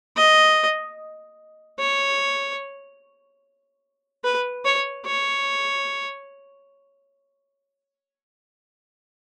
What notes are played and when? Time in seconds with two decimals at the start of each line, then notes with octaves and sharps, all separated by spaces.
0.16 D#5
1.79 C#5
4.24 B4
4.65 C#5
5.06 C#5